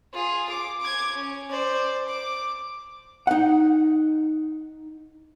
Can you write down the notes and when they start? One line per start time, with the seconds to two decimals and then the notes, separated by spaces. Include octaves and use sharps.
0.13 F4 G#4
0.50 D6
0.81 D6 G#6
1.16 C#4
1.50 C5 D5
2.08 D6
3.27 D#4 F#5